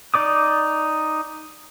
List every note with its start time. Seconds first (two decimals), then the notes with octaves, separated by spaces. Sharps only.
0.14 D#4 D5 D6 D#6